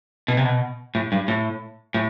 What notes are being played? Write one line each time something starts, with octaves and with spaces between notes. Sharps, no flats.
B2
C3
B2
A2
G2
A2
A2